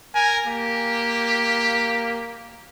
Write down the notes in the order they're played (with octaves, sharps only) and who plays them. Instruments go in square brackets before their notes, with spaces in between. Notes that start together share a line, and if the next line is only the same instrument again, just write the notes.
[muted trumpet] A#4 [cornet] G#5
[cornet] A#3 [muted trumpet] G4